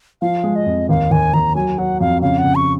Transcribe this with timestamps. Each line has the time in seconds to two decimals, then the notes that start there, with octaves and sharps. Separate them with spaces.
0.21 F3 F5
0.44 G#3
0.56 D#5
0.66 F2
0.89 D#2 F5
1.11 D#2 G#5
1.34 D#2 A#5
1.55 F#3 G#5
1.78 F#3 F#5
2.00 F2 F5
2.22 C#3 F5
2.38 F#5
2.44 C#3
2.55 C#6